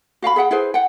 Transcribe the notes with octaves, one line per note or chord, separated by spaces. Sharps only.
F#4 F5 G5 B5
G#4 E5 F#5 G5
E4 G#4 B4 C5
F#5 G5